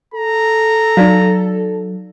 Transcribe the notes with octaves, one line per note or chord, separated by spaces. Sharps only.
A4 A#5
F#3 D#4 D5 F5